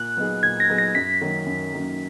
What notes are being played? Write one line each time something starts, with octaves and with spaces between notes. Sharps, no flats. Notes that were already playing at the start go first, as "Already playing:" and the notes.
Already playing: A#2 F#6
F#3 B3 D#4 G#4
A#2 G#6
A#6
F#3 B3 D#4 G#4
A#6
F#2 B6
D#3 F#3 A#3 C#4
F#2
D#3 F#3 A#3 C#4